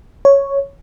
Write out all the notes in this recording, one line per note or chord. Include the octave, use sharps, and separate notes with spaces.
C#5